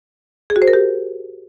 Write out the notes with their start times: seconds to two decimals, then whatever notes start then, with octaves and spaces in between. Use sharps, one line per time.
0.50 G#4
0.56 F#4
0.62 C5
0.68 A#4
0.73 G4